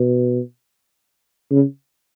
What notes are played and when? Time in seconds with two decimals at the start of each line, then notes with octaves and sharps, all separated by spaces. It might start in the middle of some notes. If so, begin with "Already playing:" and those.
Already playing: B2
1.51 C#3